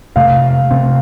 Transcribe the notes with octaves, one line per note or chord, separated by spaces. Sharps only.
F2 C3 A3 F5
C3 A3 C4